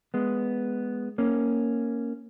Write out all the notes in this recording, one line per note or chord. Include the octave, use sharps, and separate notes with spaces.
G#3 B3
A#3 C#4